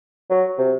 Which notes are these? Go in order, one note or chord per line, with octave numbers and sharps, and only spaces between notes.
F#3
C3